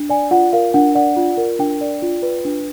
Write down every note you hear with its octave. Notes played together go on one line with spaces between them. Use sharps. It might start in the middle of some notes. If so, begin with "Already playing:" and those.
Already playing: D4
D5 G#5
F4 F#5
A#4 F5
D4 F#5
D5 F#5
F4
A#4
D4 G5
D5
F4
B4
D4